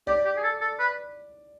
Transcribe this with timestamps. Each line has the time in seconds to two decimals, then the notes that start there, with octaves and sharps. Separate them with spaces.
0.07 G4 D5
0.25 G4
0.37 G#4
0.43 A4
0.61 A4
0.79 B4